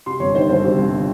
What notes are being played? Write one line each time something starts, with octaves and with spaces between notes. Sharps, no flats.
C3 C6
G1 C#5
D#3 C5
G1 C5
C3
G1